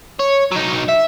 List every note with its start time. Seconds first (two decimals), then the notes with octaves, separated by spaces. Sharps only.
0.20 C#5
0.52 F#3 D#4
0.88 E5